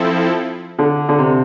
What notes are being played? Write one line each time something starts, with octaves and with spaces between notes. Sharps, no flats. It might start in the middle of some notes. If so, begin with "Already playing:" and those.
Already playing: F3 C4 E4 A4
D3
D3
C3